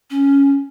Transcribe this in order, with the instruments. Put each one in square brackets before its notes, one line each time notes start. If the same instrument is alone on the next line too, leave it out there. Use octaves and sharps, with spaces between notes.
[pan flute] C#4